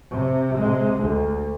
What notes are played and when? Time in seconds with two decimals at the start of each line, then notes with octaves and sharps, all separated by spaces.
0.11 C3
0.58 C3 G#3
1.00 D2